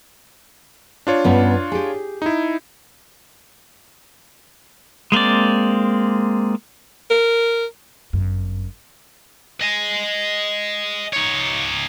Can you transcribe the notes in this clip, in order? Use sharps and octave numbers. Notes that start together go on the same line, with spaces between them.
D4 F4 C#5
G2 B3 C#4
G4 G#4
D#4 E4
G#3 A#3 C4 D5
A#4
G1 F#2
D#5 G#5
D#4 C#5